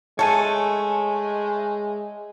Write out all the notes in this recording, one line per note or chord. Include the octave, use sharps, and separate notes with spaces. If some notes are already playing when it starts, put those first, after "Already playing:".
G#3 A3 A4 C#5 G#5